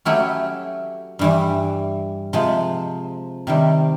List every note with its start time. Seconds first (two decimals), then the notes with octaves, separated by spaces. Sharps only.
0.05 F#3 A3 C#4 E4 G4
1.19 G2 E3 G3
2.33 C3 F3 G#3
3.47 C3 D#3 G3